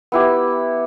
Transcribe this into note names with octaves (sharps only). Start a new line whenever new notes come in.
B3 E4 G4